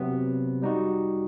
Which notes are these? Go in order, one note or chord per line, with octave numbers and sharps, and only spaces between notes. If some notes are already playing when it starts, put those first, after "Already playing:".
Already playing: C3 F#3 B3
G3 D#4 F#4